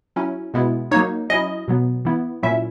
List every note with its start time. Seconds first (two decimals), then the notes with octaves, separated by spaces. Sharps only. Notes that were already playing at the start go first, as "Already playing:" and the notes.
0.16 F#3 C#4 E4
0.54 B2 G#3 B3 E4
0.91 F#3 A#3 D#4 C#5
1.30 F#3 C#4 E4 D#5
1.68 B2 F#3 B3
2.05 E3 B3 E4
2.43 A#2 F#3 C#4 E4 E5